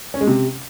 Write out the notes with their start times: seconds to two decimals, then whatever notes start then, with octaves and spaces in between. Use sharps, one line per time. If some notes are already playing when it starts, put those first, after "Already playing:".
0.14 C#4
0.21 G#3
0.27 C3